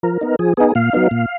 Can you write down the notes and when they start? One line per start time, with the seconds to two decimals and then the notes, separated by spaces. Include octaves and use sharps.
0.03 F3 A#4
0.21 B3 D#4
0.39 F3 G#4
0.57 B3 D#4 G#4
0.75 A#2 F5
0.93 F#3 B3 D#4
1.11 A#2